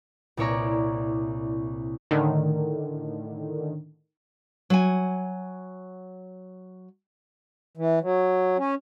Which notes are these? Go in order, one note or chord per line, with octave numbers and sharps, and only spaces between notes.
C2 A#2 E4 C#5 D5 A#5
A2 D3 D#3
F#3 F#5 G#5
E3
F#3
C#4